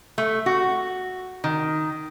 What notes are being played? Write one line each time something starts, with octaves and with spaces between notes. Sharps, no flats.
A3
F#4
D#3